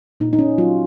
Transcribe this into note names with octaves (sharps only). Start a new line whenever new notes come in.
A#2 D#4
D#4
C#4
F#3 F4